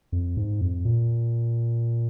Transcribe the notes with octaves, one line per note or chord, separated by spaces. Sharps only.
F2
G#2
F2
A#2